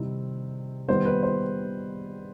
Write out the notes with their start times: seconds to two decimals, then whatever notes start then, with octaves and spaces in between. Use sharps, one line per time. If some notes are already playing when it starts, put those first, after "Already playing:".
Already playing: C3 D#3 G3 C4 E4
0.88 D#3 G3 B3 C5
1.05 B4
1.23 C5